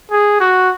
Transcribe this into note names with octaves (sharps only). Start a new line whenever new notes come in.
G#4
F#4